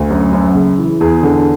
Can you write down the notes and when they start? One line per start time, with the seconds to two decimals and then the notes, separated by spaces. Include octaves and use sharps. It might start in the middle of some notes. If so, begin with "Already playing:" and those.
Already playing: D2
0.10 F#2
0.33 F#2
0.55 C#3
0.78 E3
1.00 E2 G#4
1.23 D3